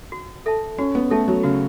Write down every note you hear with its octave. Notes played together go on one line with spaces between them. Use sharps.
F#4
A4 E5 A5
C#4 F#4
B3
A3 A4 E5 A5
F#3
C#3 F#4